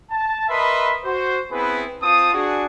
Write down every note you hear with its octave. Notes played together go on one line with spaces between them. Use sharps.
A5
A#4 B4 D#5 E5 B5 C6
F#4 C5
B3 C4 E4 G#4 B4
C4 F4 A5 D#6
D4 F#4 G#4